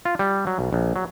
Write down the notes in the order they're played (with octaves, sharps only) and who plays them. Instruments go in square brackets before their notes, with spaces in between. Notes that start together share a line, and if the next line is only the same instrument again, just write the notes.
[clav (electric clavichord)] F4
G3
F#3
B1
A#1
F#3